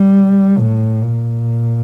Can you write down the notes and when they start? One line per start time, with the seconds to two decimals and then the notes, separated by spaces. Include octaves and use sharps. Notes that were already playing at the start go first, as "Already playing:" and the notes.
Already playing: G3
0.58 A2
1.02 A#2